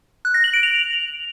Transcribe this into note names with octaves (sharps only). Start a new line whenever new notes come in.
F#6
A#6
F#7
D7
F7